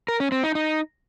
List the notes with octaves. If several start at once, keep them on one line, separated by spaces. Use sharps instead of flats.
A#4
C#4
C4
D#4
D#4